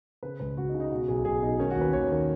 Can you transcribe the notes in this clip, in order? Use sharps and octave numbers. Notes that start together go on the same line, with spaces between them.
C#3 B4
C#2 B4
C#2 F#4
D#4
C#3
D#4
B2 F#4
B1 G#4
B1 G#4
B2 D#4
D#3 C#4
F#4
D#2
B4
D#2 C#5
D#3